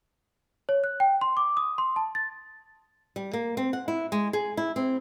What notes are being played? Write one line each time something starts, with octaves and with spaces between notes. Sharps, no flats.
C#5
F#6
G5
C6
D6
D#6
C6
A5
A6
G3
A#3
C4
F#5
E4
G#3
G#4
E4
C4